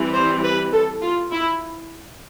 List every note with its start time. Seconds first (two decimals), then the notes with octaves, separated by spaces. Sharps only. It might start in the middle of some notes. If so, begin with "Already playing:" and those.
Already playing: E3 G3 C4
0.14 C5
0.44 B4
0.72 A4
1.02 F4
1.31 E4